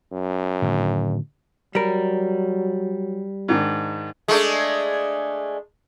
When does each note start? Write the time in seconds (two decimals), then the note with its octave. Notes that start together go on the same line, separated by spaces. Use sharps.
0.12 F#2
0.62 A2 D3 D#3
1.75 F#3 G3 A#4
3.48 G#2 D#3 D4
4.28 G#3 A3 D4